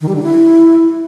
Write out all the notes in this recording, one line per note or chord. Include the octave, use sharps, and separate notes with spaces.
D#3
G3
D3
E4